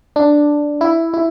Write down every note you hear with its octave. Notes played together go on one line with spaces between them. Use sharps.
D4
E4
E4